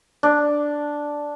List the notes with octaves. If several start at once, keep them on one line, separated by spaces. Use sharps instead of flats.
D4